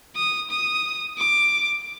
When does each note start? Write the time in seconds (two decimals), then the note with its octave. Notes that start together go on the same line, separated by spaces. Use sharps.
0.16 D#6
0.51 D#6
1.18 D6